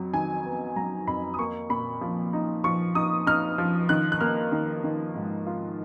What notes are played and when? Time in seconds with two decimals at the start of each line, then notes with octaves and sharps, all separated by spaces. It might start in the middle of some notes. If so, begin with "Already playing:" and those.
Already playing: F2 F#3
0.13 D#3 G#5
0.45 B3
0.76 F#3 A#5
1.07 F2 B5
1.34 D#6
1.39 A#3 C#6
1.70 A#2 B5
2.01 F3
2.33 D#4
2.64 F3 C#6
2.95 D#4 D#6
3.27 D#4 F6
3.58 F3
3.89 D#3 F#6
4.12 F#6
4.21 A#3 F6
4.52 D#3
4.84 D#3
5.15 G#2
5.46 F4